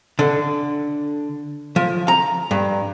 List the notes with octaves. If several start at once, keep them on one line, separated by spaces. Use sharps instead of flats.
D3
F3
A#5
G2